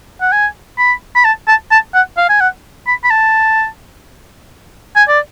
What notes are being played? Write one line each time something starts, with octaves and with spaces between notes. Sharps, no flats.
F#5
G#5
B5
B5
A5
A5
A5
F#5
F5
G#5
F#5
B5
B5
A5
G#5
D5